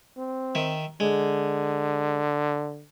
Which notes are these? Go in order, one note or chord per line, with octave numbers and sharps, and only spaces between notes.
C4
D#3 E5
D3 G#3